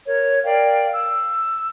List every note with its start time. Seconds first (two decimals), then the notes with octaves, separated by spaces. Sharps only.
0.07 A#4 C#5
0.44 A#4 D5 F5 G5
0.93 E6